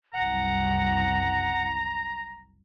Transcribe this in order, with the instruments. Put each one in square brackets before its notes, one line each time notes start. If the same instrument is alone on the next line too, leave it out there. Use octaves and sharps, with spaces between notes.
[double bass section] F#1 C2 [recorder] F#5 [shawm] A#5